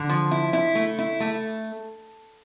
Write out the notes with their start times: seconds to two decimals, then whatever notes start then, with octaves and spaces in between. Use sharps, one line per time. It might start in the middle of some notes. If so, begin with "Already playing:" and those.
Already playing: D3
0.09 F3
0.31 E4
0.53 E4
0.75 A3
0.99 E4
1.20 A3